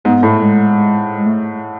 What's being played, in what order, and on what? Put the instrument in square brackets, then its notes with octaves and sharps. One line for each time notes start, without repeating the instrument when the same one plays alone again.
[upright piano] G#2 [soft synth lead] B3
[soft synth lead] B3
[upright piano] A2 [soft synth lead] A3
[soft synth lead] G#3
G#3
A3